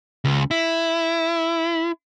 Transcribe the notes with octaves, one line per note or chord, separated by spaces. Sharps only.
C#2
E4